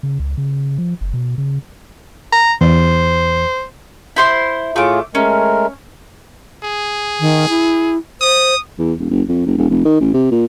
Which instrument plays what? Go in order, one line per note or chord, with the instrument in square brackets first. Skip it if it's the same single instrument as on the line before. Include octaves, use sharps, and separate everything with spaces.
[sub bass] C#3
C#2
C#3
F3
F#1
B2
C#3
[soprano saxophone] A#5
[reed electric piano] E2 [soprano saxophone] C5
[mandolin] E4 C5 C6
[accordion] A2 F4 G#4 [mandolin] A3 D6
[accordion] G#3 A3 A#4 [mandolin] C#4
[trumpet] G#4
[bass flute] D#3
E4
[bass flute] C5 [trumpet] D#6
[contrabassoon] E2
E1
F#1
F2
F#1
E1
F1
D#3
A1
C3
A#2